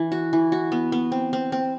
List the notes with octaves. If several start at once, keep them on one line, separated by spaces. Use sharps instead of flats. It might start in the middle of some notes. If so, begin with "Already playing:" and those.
Already playing: E3
F#4
E3
F#4
B3
B3
C4
C4
C4